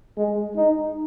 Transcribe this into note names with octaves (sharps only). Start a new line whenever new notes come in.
G#3
D#4